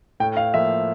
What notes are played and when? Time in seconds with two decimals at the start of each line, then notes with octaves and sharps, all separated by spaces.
0.20 A2 G5
0.37 F5
0.54 F3 A#3 E5